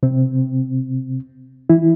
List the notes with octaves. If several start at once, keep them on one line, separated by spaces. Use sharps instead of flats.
C3 C4
E3 E4